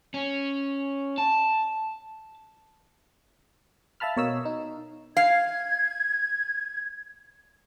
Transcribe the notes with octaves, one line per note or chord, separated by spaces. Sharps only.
C#4
A5
E5 F5 A5 B5 F6
B2 A#4 C#5 D#5 F5 E6
D#4
F5 G#6